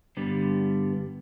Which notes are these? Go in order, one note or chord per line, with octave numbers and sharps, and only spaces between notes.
G2 D3 G3 B3